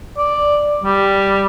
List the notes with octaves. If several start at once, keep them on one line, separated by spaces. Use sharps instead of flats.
D5
G3